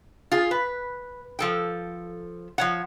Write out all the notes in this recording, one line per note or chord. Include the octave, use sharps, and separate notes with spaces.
F4 G#4
B4
F3 A4 G5
F3 C#5 F#5